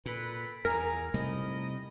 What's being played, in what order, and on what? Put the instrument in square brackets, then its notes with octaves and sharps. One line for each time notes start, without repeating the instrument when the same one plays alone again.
[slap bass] A#2 [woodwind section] F4 A4 B4
[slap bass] E2 [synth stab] A#4 [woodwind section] G#5 A#5
[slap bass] C3 G3 A3 [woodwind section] D#4 E4 D#5